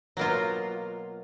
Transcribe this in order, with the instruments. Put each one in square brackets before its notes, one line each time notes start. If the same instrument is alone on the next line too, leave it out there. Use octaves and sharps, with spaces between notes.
[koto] B2 F#3 A#3 F4